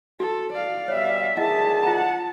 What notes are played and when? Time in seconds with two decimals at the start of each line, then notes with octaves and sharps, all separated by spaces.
0.20 F#4 A4
0.53 D5 F5
0.88 B2 G3 C#5 E5
1.37 D2 D#3 E4 G#4 D#5 F#5 A5
1.83 F4 F#5 A#5